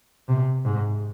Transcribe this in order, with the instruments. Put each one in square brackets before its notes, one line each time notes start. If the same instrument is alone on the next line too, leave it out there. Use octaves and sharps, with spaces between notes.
[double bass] C3
G#2